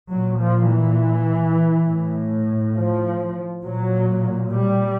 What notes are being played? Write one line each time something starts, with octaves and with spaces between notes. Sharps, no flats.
A#2 F#3
F3
E3
A2
F3
A#2 F#3
G3